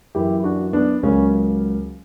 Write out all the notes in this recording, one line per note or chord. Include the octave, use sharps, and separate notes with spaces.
F#2 E3 A#3 E4 G4
D4 F#4
B3 D4
C#2 C#3 F#3 A#3 C#4